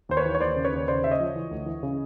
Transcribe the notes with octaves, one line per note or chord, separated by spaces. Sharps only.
D#2 C5
B4 C#5
E3
C#5
D#2 C5 D5
C#3
B4 C#5
D#2
C#3 C5 D5
C#3 E5
C#5 D#5
F3
E3
D2
E3
C#3